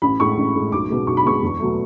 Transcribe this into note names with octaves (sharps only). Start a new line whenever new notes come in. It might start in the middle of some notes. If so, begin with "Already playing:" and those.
A1 B5
A2 G#3 C#6
A1
A2 G#3
B1 D6
B2 G#3
B1 C#6
B5
B2 G#3 C#6
E2
B2 F#3 A3